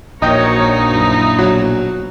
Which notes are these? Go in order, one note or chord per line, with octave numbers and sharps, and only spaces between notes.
A#1 D#4 F#4 A#4 C#5 D#5 G5
F#2 E4
B2 F#3